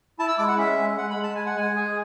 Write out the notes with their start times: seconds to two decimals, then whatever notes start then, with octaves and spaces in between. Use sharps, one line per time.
0.19 E4 A5
0.28 E6
0.38 G#3 D6
0.48 F#5
0.58 C#4 E5
0.78 G#3
0.98 G#3 F#5
1.10 B5
1.16 G#3
1.23 A5
1.35 G#3 G#5
1.46 F#5
1.57 G#3 G#5
1.76 G#4